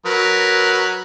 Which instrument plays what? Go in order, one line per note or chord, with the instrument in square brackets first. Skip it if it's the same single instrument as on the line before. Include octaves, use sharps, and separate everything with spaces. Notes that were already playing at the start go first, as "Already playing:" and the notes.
[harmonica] F#3 A#4 B4